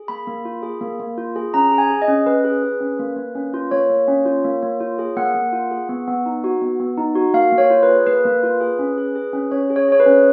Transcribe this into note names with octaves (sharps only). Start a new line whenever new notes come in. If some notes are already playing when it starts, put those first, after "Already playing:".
Already playing: G#4
A#3 B5
A#3
F4
G#4
A#3
A#3
F4
G#4
C#4 A#5
G#4
G#5
G#4
D#5
C#4
C#4 B4
G#4
G#4
C#4
A#3
A#3
C#4
F4
A#3 C#5
A#3
C#4
F4
A#3
A#3
F4
G#4
A#3 F#5
A#3
F4
G#4
B3
B3
D#4
F#4
B3
B3
D#4
F#4
A#3 F5
A#3
C#5
F4
B4
G#4
A#3 B4
A#3
F4
G#4
C#4
G#4
G#4
C#4
C#4 C#5
G#4
C#5
G#4 C#5
B4
C#4